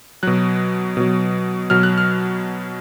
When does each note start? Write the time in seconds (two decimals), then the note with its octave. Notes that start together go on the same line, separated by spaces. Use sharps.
0.23 B2 F#3 F#6
0.97 B2 F#3
1.70 B2 F#3 F6
1.83 F#6
1.98 F6